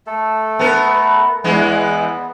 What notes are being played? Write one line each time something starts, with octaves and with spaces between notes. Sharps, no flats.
A3 A4
B3 A#4
E2 E3 G#3 B3